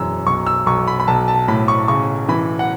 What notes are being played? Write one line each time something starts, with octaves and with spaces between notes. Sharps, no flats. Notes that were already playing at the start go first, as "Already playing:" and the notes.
Already playing: E1 F#2 E3 E6
B1 C#6
E6
B1 C#6
B5
B5
B1 A5
A5
A2 B5
C#6
C#3 C#6
E3 B5
F#5